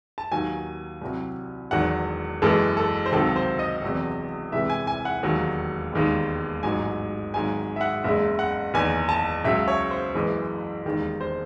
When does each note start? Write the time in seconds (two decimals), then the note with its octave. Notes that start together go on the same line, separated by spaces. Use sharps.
0.18 A5
0.32 D#2 D#3 F#3 G#5
1.01 C2 C3 F#3
1.71 E1 E2 D#3 F#3 F#5
2.42 F#1 F#2 E3 G#3 A4
2.77 A4
3.06 C5
3.12 C#2 C3 D#3 F#3 A4
3.36 C5
3.59 D#5
3.82 E1 E2 C3 F#3
4.52 C2 C3 E3 G#3 E5
4.70 G#5
4.87 G#5
5.05 F#5
5.23 E1 D#2 D#3 F#3
5.93 E1 D#2 D#3 G#3
6.63 A1 G#2 F#3 G#5
7.34 G#1 G#2 F#3 G#5
7.57 G#5
7.76 E5
7.81 F#5
8.04 F#1 E2 C#3 G#3 E5
8.39 F#5
8.74 F#1 E2 D#3 G#5
9.09 A5
9.45 C#2 C#3 F#3 E5
9.68 C#5
9.91 C5
10.14 F#1 F#2 E3 G#3
10.85 E1 D#2 D#3 G#3
11.21 C5